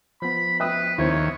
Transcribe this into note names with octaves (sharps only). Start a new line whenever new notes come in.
F3 B3 B5
B4 E5 G5 D#6
D#2 C4 E4 C#5